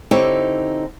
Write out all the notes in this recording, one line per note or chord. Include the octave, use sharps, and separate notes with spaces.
D3 C4 D#4 E4 G4 C#5